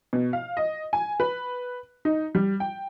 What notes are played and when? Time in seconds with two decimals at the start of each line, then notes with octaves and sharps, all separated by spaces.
0.13 B2
0.33 F5
0.57 D#5
0.93 G#5
1.20 B4
2.05 D#4
2.35 G3
2.60 G5